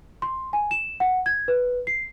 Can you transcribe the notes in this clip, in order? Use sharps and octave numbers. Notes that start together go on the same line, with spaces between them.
C6
G#5
E7
F#5
G#6
B4
C7